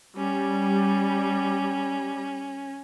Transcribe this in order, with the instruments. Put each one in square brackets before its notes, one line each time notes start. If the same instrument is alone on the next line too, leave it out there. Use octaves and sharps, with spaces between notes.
[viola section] G3 [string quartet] C#4